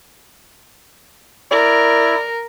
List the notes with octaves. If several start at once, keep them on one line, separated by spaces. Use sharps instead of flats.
E4 A#4 D5